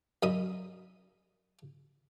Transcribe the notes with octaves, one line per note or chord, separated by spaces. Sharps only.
F#2 D#5 B5 D#6